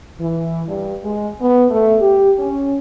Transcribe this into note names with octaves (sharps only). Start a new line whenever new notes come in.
E3
G2
G#3
B3
A3
G4
C#4